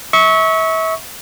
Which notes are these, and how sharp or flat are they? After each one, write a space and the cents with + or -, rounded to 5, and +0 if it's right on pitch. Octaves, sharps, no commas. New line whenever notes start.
E5 -35 C#6 +0